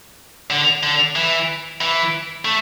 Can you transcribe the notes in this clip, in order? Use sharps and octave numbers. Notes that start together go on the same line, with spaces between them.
D3
D3
E3
E3
A3